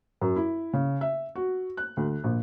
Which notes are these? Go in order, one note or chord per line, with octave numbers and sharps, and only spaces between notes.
F#2
E4
C#3
E5
F#4
F#6
D2
A#1